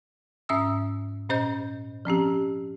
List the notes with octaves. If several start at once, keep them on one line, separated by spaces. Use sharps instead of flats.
G#2 C#4 E5 D#6 E6
A#2 C#4 C5 D#5 G6
F3 C4 C#4 G4